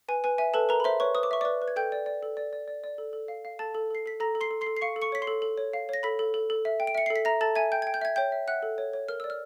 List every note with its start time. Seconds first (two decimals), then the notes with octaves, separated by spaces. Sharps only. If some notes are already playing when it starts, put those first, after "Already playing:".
0.08 B4 G#5
0.24 B4 G#5
0.38 E5 G#5
0.54 A4 B4 A5
0.69 A#4 B4 A#5
0.80 B5
0.84 C5 E5 C6
1.00 B4 C#5 C#6
1.15 B4 D#6
1.23 D6
1.31 E5 C#6
1.41 B4 D5 D6
1.62 B4
1.68 G#6
1.76 A4 G5 G6
1.92 D5
2.06 D5
2.23 A4
2.37 D5
2.53 D5
2.68 D5
2.84 D5
2.98 A4
3.13 A4
3.28 F5
3.45 F5
3.59 A4 A5 A6
3.75 A4
3.90 A4 C7
4.06 A4 B6
4.20 A4 A#5 A#6
4.35 A4
4.41 C6 C7
4.51 A4
4.61 C6 C7
4.67 A4
4.77 C7
4.81 F5 C#6 C#7
4.96 A4
5.02 C#6 C#7
5.12 C#5 B6
5.22 C6 C7
5.27 A4
5.42 A4
5.58 C#5
5.73 F5
5.89 C#5 A#6
6.03 A4 B5 B6
6.19 A4
6.34 A4
6.50 A4
6.65 E5
6.80 G5
6.87 D7
6.95 E5 C#7
7.06 A4 C7
7.16 B6
7.25 E5 A#5 A#6
7.41 A4 A5 A6
7.56 E5 G#5 G#6
7.72 G5 G6
7.82 G5 G#6
7.94 G6
8.02 E5 G#6
8.16 C#5 G5 G6
8.32 E5
8.48 E5 F#5 F#6
8.62 A4
8.78 C#5
8.93 C#5
9.09 A#4 F6
9.20 D5 E6
9.30 F6